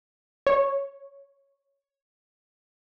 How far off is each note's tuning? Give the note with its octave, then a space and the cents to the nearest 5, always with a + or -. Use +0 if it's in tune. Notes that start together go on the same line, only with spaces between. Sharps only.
C#5 -5